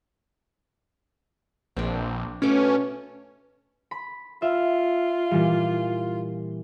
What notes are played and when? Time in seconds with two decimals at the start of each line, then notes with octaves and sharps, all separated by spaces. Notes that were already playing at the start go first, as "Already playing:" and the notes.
1.77 A#1 C4 D4
2.42 B2 A3 C#4 D6
3.91 B5
4.42 F4 E5 F5
5.31 A#2 E3 G3